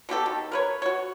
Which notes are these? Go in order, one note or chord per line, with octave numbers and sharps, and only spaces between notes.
B2 B3 G4 A4
D#3
A#4 B4 C#5
F#4 C#5